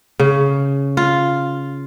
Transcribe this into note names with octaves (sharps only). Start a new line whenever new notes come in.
C#3
F4